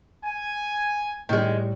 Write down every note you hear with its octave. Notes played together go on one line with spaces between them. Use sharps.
G#5
A2 D#3 G3 G#3